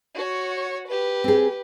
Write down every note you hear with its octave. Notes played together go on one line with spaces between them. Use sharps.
F#4 C#5
G4 B4
C4 G#4